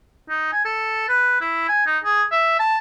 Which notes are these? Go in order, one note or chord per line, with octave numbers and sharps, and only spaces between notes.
D#4
G#5
A4
B4
E4
G#5
D#4
G#4
E5
A5